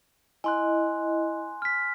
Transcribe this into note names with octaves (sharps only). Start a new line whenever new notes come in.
E4 D#5 G#5 C6 F#6
F6 B6